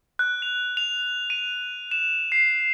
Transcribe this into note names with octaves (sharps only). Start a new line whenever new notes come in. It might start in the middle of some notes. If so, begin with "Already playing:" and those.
F#6
F7
F7
D#7
E7
C7